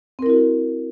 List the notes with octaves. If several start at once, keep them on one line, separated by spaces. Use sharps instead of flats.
C4 E4 F#4 A#4